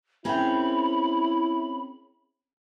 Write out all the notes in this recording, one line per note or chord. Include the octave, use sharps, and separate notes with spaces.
C4 C#4 E4 G#4 A#4 E5 G5 B5